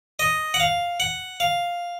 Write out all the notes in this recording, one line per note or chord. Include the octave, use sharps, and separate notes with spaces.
D#5
F#5
F5
F#5
F5